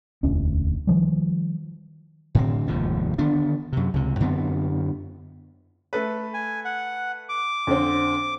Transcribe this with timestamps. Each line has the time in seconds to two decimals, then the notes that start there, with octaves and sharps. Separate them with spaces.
0.23 E1 D2 C#4
0.87 D#3 F3 G3
2.35 A2 D3 C4
2.68 F1 D#2 G#2 F3
3.18 D3 D#3 B3 D4
3.73 F#2 C3
3.94 C#2 C3
4.20 F#2 D3 B3 C4
5.93 A3 A4 B4
6.34 G#5
6.65 F#5
7.29 D6
7.67 F2 D3 C4